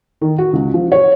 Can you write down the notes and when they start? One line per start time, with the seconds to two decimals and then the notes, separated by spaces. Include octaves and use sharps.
0.21 D#3
0.38 F#4
0.53 C#2
0.74 F3
0.92 C#5